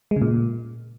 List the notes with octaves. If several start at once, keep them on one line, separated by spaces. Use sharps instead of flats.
G#3
C#3
A#2